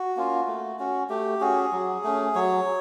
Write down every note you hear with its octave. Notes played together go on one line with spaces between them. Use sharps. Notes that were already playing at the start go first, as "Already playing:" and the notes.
Already playing: F#4
A#3 C#4 F4
A3
C#4 F#4
A3 G4
C#4 F#4 G#4
F#3
A3 C#4
F#3 C#5